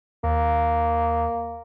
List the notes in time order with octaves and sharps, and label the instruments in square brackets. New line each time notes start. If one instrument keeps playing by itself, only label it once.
[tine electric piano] D#2 [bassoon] A#3